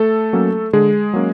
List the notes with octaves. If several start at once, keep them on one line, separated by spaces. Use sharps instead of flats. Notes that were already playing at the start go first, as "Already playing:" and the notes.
Already playing: A3 A4
F#3 A#3 C#4
D3 G#3 G#4
F#3 A#3 C#4